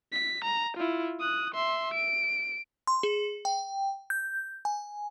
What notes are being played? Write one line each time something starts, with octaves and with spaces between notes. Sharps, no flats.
B6
A#5
E4 F4
D#6 F#6
E5 C6
D7
C6
G#4
G5
G6
G#5